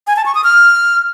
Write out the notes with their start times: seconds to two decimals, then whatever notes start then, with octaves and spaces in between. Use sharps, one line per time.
0.07 G#5
0.16 A5
0.26 C#6
0.35 D#6
0.44 F6